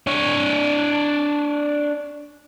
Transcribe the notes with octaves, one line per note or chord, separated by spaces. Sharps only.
D4 C#5